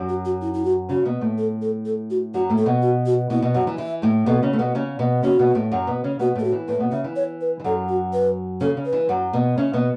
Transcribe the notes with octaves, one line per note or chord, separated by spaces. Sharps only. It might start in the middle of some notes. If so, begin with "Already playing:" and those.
Already playing: F#2 F#3
F#4
F#4
E4
E4
F#4
C#3 C#4 F#4
B2 B3
A2 A3
A4
A4
A4
F#4
F#2 F#3 F#4
A2 A3
A4
B2 B3
F#4
F#4
B2 B3 E4
B2 B3
F#2 F#3 F#4
E3
E3 E5
A2 A3
B2 B3 A4
C#3 C#4
A3
B2 B3
C#3 C#4
B2 B3
C#3 C#4 F#4
B2 B3
A2 A3
F#2 F#3
B2 B3
C#3 C#4
B2 B3 F#4
A2 A3 A4
F#4
E3
A2 A3 B4
B2 B3
C#3 E5
E3
C#5
B4
E3
F#2 F#3 A4
F#4
B4
C#3 C#4 A4
C#3
B4
E3
F#2 F#3
B2 B3
C#3 C#4 E5
B2 B3